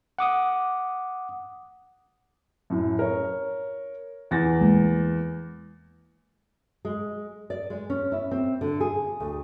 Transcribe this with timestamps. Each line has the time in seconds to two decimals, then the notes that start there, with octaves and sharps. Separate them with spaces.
0.19 F#5 D6 D#6
2.70 F#2 A2
2.99 A#4 C#5
4.31 E2 A6 A#6
4.61 G#3 A#3
6.85 G#3
7.50 D5
7.70 G#3
7.90 C#4
8.12 E4
8.31 C4
8.61 D3
8.80 G#4
9.20 D2